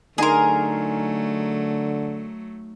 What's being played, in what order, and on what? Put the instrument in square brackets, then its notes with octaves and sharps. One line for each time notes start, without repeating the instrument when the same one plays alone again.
[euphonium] D3 [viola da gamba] F#3 A3 [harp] D#4 G#5 C6 [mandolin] G#4 A#4